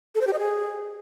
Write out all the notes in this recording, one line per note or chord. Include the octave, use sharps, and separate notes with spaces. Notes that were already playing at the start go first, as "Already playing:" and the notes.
A4
C5
G4
D#5
G#4